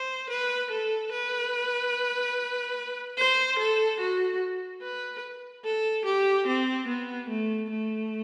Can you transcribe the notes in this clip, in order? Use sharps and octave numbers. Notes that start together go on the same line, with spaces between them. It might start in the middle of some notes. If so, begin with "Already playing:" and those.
Already playing: C5
B4
A4
B4
C5
A4
F#4
B4
A4
G4
C4
B3
A3
A3